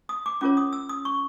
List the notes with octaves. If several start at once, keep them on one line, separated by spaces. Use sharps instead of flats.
D#6
D6
C#4 F4 A#4 C#5 D6
D#6
E6
D#6
C#6